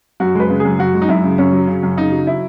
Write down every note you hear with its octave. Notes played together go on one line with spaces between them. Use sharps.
F#2 F#4
G#3 B4
C#3
G#4
F#2
F#2 F#4
G#3
D#4
F#2 E4
C#3
F#2 C#4
F#3
C#3
F#2
C#3 D#4
F#3
E4